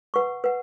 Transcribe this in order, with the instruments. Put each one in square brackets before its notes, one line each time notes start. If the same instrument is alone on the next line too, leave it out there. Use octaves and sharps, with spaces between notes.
[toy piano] B4 F#5 C#6
B4 F#5